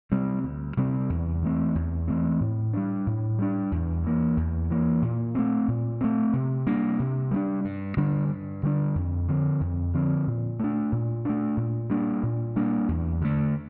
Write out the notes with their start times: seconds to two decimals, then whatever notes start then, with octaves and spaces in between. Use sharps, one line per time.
0.11 C3 G3 C4
0.44 D2
0.77 C3 G3 C4
1.10 E2
1.42 E3 A3 C4
1.75 E2
2.08 E3 A3 C4
2.41 A2
2.73 G3 D4
3.07 A2
3.39 G3 D4
3.72 E2
4.04 E3 A#3
4.37 E2
4.70 E3 A#3
5.02 A#2
5.35 A3 C4
5.68 A#2
6.01 A3 C4
6.33 C3
6.67 G3 A#3 D4
6.99 C3
7.31 G3 A#3 D4
7.65 G2
7.97 D3 G3 D4
8.30 G2
8.63 D3 G3 D4
8.95 F2
9.28 D3 F3 C4
9.61 F2
9.93 D3 F3 C4
10.27 A#2
10.59 A3 D4
10.92 A#2
11.25 A3 D4
11.57 A#2
11.90 G3 A#3 D4
12.23 A#2
12.56 G3 A#3 D4
12.88 E2
13.21 D3 A3